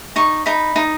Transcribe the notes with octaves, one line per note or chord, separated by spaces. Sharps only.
D#4 C#6
D#4 B5
D#4